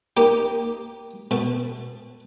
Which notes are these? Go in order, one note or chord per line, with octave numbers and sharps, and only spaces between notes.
A#3 D#4 G4
B2 A3